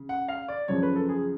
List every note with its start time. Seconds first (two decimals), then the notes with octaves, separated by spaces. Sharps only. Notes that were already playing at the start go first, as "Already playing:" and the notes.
Already playing: C#3
0.09 F#5
0.28 F5
0.48 D5
0.68 F#2 C#3 F3 C#5
0.83 B4
0.96 A4
1.09 G#4